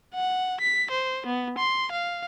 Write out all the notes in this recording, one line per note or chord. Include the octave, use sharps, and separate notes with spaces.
F#5
B6
C5
B3
C6
F5